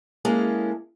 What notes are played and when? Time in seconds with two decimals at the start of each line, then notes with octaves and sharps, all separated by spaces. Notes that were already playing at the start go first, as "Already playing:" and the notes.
0.25 G#3 A#3 C#4 E4 G#4 A4